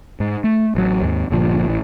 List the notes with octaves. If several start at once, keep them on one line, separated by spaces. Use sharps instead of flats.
G#2
A3
A1 F#3
D#2 G#2
G1 A#2 F3
A1 E3